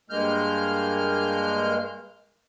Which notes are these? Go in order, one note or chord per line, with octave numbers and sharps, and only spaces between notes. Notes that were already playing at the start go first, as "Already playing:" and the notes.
G2 G#3 A#3 F6 G6